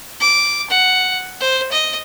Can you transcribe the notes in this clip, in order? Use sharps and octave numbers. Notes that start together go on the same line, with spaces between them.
D6
F#5
C5
D#5